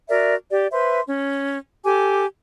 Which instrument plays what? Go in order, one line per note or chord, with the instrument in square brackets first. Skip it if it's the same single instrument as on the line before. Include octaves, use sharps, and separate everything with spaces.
[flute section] F#4 A#4 D5 E5
G4 D5
B4 C5 E5 C6
C#4
G4 A4 G#5 D6